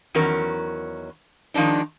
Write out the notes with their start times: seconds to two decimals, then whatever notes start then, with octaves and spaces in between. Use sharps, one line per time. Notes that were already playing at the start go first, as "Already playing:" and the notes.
0.15 E2 D#3 F#3 C#4 A#4
1.54 D#3 F3 G#3 D4 D#4